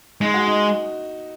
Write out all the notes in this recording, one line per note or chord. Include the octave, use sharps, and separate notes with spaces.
G#3 D#4
F#4
D#4